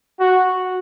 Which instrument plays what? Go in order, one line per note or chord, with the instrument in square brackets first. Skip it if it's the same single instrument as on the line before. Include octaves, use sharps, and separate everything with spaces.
[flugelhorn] F#4